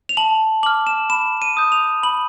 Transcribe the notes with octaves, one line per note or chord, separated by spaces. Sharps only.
F7
A5 F#7
D6 F6 F#7
E7
B5 E7
D#7
D#6 G6
F7
B5 F#7